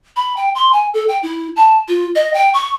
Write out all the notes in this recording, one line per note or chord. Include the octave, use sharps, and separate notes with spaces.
B5
G5
C6
G#5
A4
G5
E4
A5
F4
D#5
G5
C#6